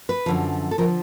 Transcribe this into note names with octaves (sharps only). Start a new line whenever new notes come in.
B4
F#2 D3 F3
A4
D3 F3 A#4